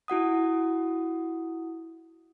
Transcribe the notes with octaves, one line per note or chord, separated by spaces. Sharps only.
E4 F#4 F#5 D#6